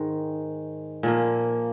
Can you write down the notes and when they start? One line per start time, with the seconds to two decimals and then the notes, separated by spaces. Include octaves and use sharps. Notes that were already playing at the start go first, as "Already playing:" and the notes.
Already playing: G#2 D#3 G#3
1.03 A#2 F3 A#3